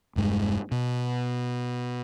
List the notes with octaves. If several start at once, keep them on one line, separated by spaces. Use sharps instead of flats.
E1 G2 G#3
B2